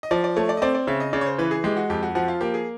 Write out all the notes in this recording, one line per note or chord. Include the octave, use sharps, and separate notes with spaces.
D#5
F3 D5
D5
A3 C#5
D5
D#5
C4 D5
D5
C#3 E5
D#5
C#3 D5
C#5
C5
E3 B4
G#4
G#3 G4
F#4
F2 G4
F#4
F3 F#4
F4
A#3 G4
G#4